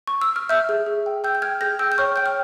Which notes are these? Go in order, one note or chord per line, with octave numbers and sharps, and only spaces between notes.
C#6
E6
F6
E5 E6 G6
G#4
G#4
G5
G5 E6 G6
G6
G5 F6 G#6
G#4 G6 A#6
G5 E6 G6
G6
C#5 C#6 F6
G5 G6
F6